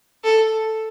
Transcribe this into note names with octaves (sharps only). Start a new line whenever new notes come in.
A4